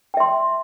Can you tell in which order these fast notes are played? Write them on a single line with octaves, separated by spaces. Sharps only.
G5 E5 C6